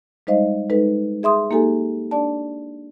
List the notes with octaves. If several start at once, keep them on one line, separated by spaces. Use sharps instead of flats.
G3 G#3 D#4 C5 D#5 F5
G#3 D#4 A4 B4
G#4 E5 C6 D#6
A#3 D#4 G4 A4 G#5
D4 D5 A5